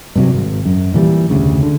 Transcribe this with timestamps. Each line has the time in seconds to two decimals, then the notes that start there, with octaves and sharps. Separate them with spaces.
0.15 G2 C3 F#3
0.33 G#1
0.65 F#2
0.94 A#2 E3 F#3 G3
1.30 F1 D2 C#3
1.63 D3